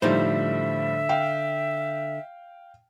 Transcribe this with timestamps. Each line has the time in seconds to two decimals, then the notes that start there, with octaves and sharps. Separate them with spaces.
0.02 A2 D3 F3 G3 D#4 C5 E5
1.09 F5 G5